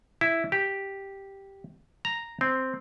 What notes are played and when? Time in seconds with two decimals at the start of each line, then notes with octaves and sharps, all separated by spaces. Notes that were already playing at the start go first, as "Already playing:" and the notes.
0.21 E4
0.52 G4
2.05 A#5
2.41 C4